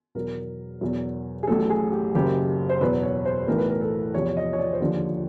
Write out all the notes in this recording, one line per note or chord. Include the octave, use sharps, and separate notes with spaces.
E2 B2 F#3 A#4
E2 B2 F#3
G#4
A1 A2 F#3 A4
G#4
G4
F#1 F#2 C#3 G4
C5
E2 B2 F#3 B4
C#5
C5
B1 A2 E3 A#4
B4
A#4
A4
E2 C3 F3 C#5
D#5
C#5
D5
C5
D#2 D3 F3 C#5